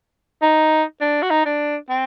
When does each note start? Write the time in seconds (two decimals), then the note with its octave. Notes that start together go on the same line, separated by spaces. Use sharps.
0.42 D#4
1.01 D4
1.22 F#4
1.30 D#4
1.45 D4
1.89 C4